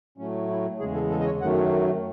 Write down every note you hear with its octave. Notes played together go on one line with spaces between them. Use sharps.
A2 F#3 A3 C#4
E4
E2 C#3 G#3 G#4
A4
A4
D#5
C#5
F#2 D#3 F#3 A3 F#5